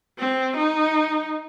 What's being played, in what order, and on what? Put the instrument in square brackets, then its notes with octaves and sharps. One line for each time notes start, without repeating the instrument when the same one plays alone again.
[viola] C4
D#4